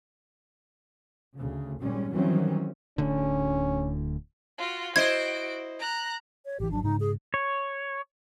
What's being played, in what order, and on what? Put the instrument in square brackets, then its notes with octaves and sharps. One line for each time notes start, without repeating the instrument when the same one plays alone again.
[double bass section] D2 C#3
G#1 A#2 G3 G#3 C#4
D#3 E3 F#3 G3 C4 C#4
[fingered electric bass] D1 D2 D3 [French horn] C#4
[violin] F4 F#4
[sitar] E4 C5 D#5 [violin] F#4 D7 [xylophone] G#6
[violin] A#5 F#6
[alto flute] C#5
[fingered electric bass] A1 E3 [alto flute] G4
[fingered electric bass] G#1 F#3 [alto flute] D4
[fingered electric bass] G#2 C#3 [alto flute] D#4
[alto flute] G#4
[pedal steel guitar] C#5